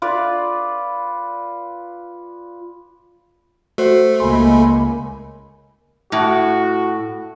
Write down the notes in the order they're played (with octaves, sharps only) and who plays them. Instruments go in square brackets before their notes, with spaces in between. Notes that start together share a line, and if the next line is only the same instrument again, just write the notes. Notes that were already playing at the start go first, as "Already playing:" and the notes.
[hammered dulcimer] F4 B4 D5
[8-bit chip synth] A3 [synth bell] F#4 C5
[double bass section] C#2 A#3 [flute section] D#5 G#5 B5 [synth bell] C6
[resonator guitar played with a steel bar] A2 [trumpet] F#4